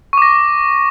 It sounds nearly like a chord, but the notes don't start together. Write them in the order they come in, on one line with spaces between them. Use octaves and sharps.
C#6 D6 A#6